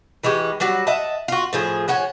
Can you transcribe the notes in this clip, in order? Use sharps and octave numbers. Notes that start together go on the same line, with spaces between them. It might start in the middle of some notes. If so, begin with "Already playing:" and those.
E3 G#3 F#4 G4
F#3 G3 F#4 F#5
D#5 E5 F#5 A5
F4 F#4
A2 F3 G#4
F3 C#5 F#5 G#5